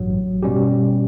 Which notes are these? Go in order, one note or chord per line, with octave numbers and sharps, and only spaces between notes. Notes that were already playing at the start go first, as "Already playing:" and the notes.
Already playing: A1 G2 F#3
B2 G3 C#4 G4